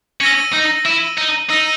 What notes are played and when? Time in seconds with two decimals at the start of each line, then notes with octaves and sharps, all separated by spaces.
0.21 C#4 E6 A#6 D#7 F#7
0.54 D#4
0.85 E4 E6 A#6 D#7 F#7
1.18 D#4
1.50 D#4 E6 A#6 D#7 F#7